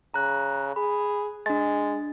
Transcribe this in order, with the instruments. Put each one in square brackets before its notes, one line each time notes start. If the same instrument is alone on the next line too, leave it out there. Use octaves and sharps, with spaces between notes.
[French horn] C#3 [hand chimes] A#5 F#6
[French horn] G#4 [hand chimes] B5
[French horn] G#3 [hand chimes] D4 A6